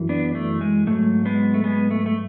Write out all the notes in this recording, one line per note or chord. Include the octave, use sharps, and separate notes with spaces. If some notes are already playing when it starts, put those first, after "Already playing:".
Already playing: F#2 E3
B3 D4
A3
G#3
G#2 F#3 A3
G#3 B3
A3
G#3 B3
A3
A3